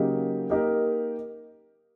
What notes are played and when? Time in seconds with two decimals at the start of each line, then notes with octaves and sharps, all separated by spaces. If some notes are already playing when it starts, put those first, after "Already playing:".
Already playing: C#3 F#3 A#3 D#4 G4
0.50 A#3 D#4 G4 A#4